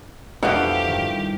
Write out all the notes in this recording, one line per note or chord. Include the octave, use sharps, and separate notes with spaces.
F2 B2 D3 E3 G4 F5
G2 D#3 E4